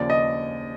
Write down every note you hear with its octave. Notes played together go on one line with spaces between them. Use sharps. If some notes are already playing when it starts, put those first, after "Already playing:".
Already playing: D#2 C#3 F3 D5
D#5